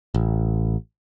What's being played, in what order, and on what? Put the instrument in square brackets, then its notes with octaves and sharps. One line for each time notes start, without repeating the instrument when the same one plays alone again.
[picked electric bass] A1